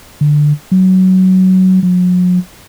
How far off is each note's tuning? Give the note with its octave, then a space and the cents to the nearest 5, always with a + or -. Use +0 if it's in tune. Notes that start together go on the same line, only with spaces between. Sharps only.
D3 +10
F#3 +15
F#3 -45